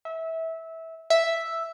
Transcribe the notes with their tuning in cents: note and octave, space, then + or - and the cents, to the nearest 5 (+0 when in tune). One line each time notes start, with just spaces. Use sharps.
E5 -20
E5 +0